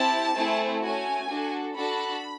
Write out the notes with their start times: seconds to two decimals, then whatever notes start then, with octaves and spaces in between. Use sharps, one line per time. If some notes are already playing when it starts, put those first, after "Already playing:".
Already playing: C4 E4 G4 A5
0.35 A3 C4 E4 G#4
0.82 A3 C#4 F#4 G#5
1.29 D4 F#4 A4
1.75 D4 F#4 A4 B5